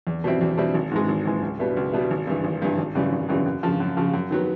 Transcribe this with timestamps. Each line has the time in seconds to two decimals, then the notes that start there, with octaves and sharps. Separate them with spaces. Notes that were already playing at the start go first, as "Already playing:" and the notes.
0.07 E2
0.24 B2 G3 C4 E4
0.41 E2
0.57 B2 G3 C4 E4
0.74 G#1
0.92 G#2 E3 G#3
1.08 G#1
1.25 G#2 E3 G#3
1.43 C#2
1.59 B2 G3 B3 E4
1.77 C#2
1.93 B2 G3 B3 E4
2.10 G#1
2.27 G2 E3
2.44 G#1
2.62 G2 E3
2.78 G#1
2.95 F#2 C#3 E3 G3
3.12 G#1
3.29 F#2 C#3 E3 G3
3.46 F#2
3.63 C#3 F3
3.80 F#2
3.97 C#3 F3
4.14 F#2
4.31 D#3 F#3 B3